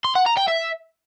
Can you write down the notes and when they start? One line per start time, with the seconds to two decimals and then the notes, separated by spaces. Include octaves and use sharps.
0.05 C6
0.15 F#5
0.26 A#5
0.37 G5
0.48 E5